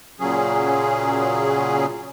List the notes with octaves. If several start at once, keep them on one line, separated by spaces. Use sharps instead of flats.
A#2 C#3 F#3 C#4 G#4